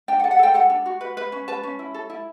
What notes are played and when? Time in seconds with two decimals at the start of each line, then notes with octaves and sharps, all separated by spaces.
0.08 D4 G5
0.19 F#5
0.24 A4
0.31 F#5
0.39 A4 G5
0.54 A4 F#5
0.70 D4
0.86 F#4
1.01 B4
1.17 B4
1.32 C#4
1.48 B4 A5
1.63 C#4
1.79 E4
1.94 A4
2.10 E4